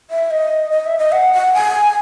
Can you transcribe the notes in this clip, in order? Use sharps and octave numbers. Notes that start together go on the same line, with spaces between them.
E5
D#5
D#5
E5
D#5
F#5
F#5
G#5